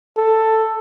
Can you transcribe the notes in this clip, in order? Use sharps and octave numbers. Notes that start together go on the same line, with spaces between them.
A4